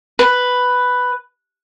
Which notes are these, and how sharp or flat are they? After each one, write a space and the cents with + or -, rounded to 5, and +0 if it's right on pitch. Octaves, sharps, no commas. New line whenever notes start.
B4 +5